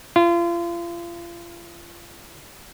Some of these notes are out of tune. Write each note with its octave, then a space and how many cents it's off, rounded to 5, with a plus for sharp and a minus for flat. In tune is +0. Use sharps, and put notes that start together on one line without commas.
F4 -35